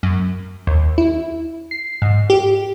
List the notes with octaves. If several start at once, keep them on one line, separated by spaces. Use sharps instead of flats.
F#2
D#2
E4
C7
G#2
G4